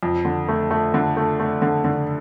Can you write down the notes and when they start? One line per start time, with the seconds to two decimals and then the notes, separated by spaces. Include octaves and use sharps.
0.03 F2
0.25 D3
0.48 A3
0.71 A3
0.94 D3
1.17 A3
1.40 A3
1.62 D3
1.84 D3